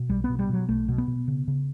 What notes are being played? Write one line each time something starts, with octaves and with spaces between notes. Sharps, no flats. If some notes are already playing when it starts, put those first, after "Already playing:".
Already playing: B2
B1 G3
B3
B2
G3
B2 F#3
B1 A3
B2
B3
B2
C#3
C#3